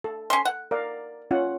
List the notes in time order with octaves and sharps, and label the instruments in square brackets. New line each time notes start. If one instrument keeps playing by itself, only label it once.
[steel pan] A4
[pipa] C#4 C6
F#5
[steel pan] A#4 D5 F5
C#4 F4 F#5